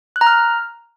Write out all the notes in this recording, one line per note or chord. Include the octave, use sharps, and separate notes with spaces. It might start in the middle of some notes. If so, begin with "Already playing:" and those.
F#6
A#5
F6